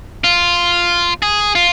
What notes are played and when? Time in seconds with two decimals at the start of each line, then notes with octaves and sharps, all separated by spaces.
0.24 F4
1.22 G#4
1.55 F4